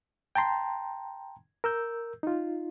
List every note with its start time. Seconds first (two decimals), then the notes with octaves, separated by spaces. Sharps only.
0.35 G5 A5 A#5 C6
1.64 A#4 E6 G6
2.23 D#4 F4